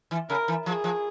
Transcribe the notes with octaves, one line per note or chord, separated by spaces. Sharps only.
E3
C#3 A#4
E3
F3 G#4
F3